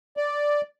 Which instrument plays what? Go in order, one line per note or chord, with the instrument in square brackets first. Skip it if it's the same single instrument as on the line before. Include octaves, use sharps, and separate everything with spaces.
[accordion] D5